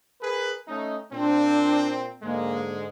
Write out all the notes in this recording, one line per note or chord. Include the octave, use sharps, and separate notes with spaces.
G#4 A#4 B4
A3 C#4 D#4
A#2 C4 D4
G#2 D3 G#3 A#3